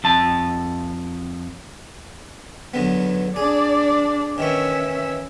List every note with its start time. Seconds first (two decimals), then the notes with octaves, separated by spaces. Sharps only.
0.04 F2 A5
2.74 E2 D3 F#3 B3
3.36 D4 G#4 D5
4.38 D#3 E3 C#4 E5 C#6